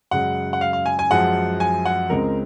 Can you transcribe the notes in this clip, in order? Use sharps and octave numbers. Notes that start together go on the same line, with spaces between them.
F#2 C#3 G#3 F#5
F#5
F5
F5
G#5
G#5
F#2 F3 G#3 F#5
G#5
F#5
C#2 C#3 G#3 C4 A#4